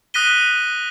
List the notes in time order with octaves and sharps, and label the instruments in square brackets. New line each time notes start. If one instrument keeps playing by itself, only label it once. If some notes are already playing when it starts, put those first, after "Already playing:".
[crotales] D#6 F#6 A#6 B6 D#7 G7